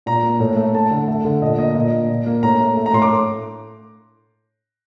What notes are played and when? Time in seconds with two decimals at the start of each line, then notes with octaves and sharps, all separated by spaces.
0.06 A#2 A#5
0.23 A#3
0.40 A2
0.57 A3
0.75 A3 A5
0.91 D3
1.08 A3
1.25 D3
1.42 A#2 D#5
1.58 A#3 D#5
1.75 A#2 D#5
1.92 A#3
2.09 A#2
2.26 A#3
2.43 A2 A#5
2.60 A3
2.77 A3
2.86 A#5
2.93 A2 C6
3.02 D6